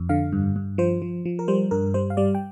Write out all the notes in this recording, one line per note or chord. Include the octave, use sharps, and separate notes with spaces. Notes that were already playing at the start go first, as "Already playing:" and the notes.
Already playing: F2
D3 F5
G2
G2
F3 C5
F3
F3
A#4
G3 C5
G2 A#4
G3 C5
F5
G3 D5
G5